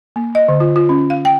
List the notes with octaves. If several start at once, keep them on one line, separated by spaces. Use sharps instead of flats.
A#3
D#5
D3
F4
F4
C#4
F5
G5